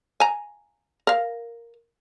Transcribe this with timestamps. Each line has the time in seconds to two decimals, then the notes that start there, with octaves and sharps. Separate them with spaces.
0.20 G#5 A#5
1.07 A#4 F5